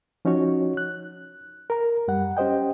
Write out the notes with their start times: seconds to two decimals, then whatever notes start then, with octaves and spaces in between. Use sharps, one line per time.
0.25 F3 C#4 D#4 F#4 C#5
0.77 F#6
1.70 A#4 A#5
2.08 F#2 G3 F#5
2.37 C#4 G4 C5 D#5 G5